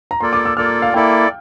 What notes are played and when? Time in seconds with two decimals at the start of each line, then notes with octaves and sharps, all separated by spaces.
0.11 A#5
0.20 A#3 F4 A4 D5 C6
0.33 D6
0.45 E6
0.57 A#3 F4 A4 D5 F6
0.82 F5
0.94 A#3 E4 A4 D5 G5